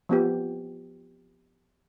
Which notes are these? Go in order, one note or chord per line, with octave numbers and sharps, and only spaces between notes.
F3 B3 G4